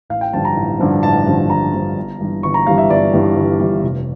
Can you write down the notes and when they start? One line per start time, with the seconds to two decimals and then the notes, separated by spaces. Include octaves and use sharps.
0.10 A1 F5
0.21 G5
0.33 G2 D3 F3 A5
0.45 A#5
0.56 A1
0.80 G2 D3 F3
1.03 A1 A5
1.26 G2 D3 F3
1.50 A1 A#5
1.73 G2 D3 F3
1.97 G1
2.20 G2 E3 G3
2.43 G1 C#6
2.54 A#5
2.67 G2 E3 G3 F5
2.78 E5
2.90 G1 D5
3.13 G2 E3 G3
3.36 G1
3.60 G2 E3 G3
3.83 F1